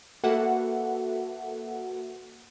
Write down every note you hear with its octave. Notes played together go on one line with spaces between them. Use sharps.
A#3 F#4 A4 B4 E5 F#5